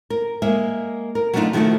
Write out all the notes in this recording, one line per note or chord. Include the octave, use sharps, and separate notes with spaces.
A#4
G#3 A#3 E5
A#4
F#3 G3 A3 D4 D#4 F4
D#3 F3 A3 E4 F#4 A4